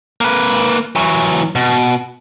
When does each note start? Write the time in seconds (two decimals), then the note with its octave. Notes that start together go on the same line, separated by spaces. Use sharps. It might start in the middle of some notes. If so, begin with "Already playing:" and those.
0.21 A#3 B4
0.96 E3 F#3
1.55 B2